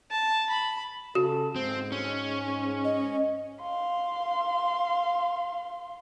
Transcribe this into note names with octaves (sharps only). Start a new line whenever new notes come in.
A5
B5
C#3 F#4 A4
G#2 G#3 C4
C#4
D#5
F5 C6